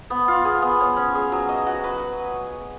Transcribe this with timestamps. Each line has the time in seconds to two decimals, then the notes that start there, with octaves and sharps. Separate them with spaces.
0.10 B3
0.28 F4
0.45 G#4
0.62 B3
0.80 C#5
0.97 C#4
1.15 G#4
1.32 F#3
1.49 D#5
1.66 F#4
1.84 B4